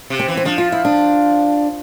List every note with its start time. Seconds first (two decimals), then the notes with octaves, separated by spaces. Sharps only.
0.10 C3
0.19 C4
0.28 E3
0.37 C4
0.45 F3 D4
0.58 F4
0.72 E4
0.85 D4